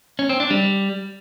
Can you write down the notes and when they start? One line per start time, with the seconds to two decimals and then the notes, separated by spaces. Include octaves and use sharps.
0.19 C#4
0.29 C4
0.40 D4
0.50 G3